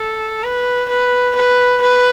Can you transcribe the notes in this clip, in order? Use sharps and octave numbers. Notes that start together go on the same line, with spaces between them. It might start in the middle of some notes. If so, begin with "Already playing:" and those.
Already playing: A4
B4
B4
B4
B4